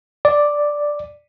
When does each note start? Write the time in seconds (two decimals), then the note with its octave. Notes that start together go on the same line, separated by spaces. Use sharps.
0.25 D5